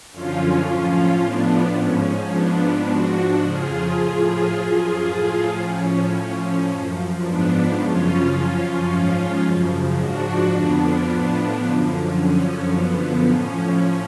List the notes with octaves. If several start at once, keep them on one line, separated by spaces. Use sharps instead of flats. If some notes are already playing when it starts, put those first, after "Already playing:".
F#2 D3 F3 C#4 F4
A2 F3
A2 F3 B3 D4
G#2 F3 C#4
G#2 F3 B3 D4
G#2 F3 D4 F#4
F2 C#3 F3 F4 G#4
A2 F3
F#2 F3 F4 G#4
A2 F3
A2 F3 C#4
A2 F3
F#2 F3
G#2 F3 B3 D4
F#2 C#3 F3 C#4 F4
F#2 F3
G#2 F3
F#2 C#3 F3
G#2 F3 D4 F#4
F2 D3 F3 B3 D4
A2 F3
F#2 D3 F3
F#2 D3 F3 C#4
F#2 D3 F3 B3
A2 F3 C#4